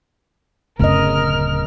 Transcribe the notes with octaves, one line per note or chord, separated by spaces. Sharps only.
D1 F#2 C#3 A#4 D#5 F6